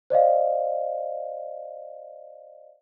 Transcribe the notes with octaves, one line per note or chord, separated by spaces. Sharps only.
C5 D5 D#5 F5